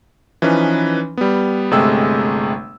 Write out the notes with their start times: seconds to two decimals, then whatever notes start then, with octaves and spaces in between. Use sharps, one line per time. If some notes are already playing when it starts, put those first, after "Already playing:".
0.42 E3 F3 C#4 D#4 B4
1.17 G3 B3
1.71 G1 C3 G#3 A3 G5 E6